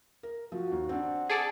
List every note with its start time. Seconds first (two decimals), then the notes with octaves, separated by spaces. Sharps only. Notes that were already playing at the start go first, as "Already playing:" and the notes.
0.23 A#4
0.52 F3 F#4
0.72 D#2
0.89 C4 D4 F#5
1.29 G#4 A4 D5